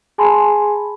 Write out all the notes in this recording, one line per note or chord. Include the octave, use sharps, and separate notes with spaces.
G#4 G#5 A5 B5 C6